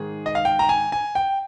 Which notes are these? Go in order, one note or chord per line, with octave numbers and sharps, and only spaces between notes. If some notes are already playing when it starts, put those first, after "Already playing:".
Already playing: G#2 D#3 G#4
D#5
F5
G5
A#5
G#5
G#5
G5